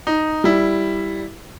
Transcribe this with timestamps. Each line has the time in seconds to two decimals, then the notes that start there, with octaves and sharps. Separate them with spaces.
0.07 D#4
0.44 G3 E4